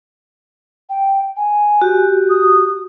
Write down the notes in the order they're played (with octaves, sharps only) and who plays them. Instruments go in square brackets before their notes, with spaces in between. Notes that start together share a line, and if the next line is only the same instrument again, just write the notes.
[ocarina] G5
G#5
[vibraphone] F#4 G4
[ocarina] D#6